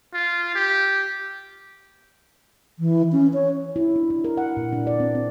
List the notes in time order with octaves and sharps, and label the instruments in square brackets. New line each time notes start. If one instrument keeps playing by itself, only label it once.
[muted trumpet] F4
G4
[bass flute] E3
C#4
C#5
[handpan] E4
D4
E4
A#4
F#5
A#2
D4
D5
C4
C4